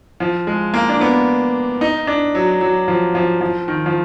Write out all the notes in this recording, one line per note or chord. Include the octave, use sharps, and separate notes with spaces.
F3
G#3
A#3
D4
B3
D#4
D4
F#3
F#3
F3
F3
F3
D#3
F3